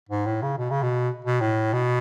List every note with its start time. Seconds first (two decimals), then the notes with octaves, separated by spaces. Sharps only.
0.09 G#2
0.26 A2
0.42 C#3
0.58 B2
0.70 C#3
0.83 B2
1.25 B2
1.41 A2
1.73 B2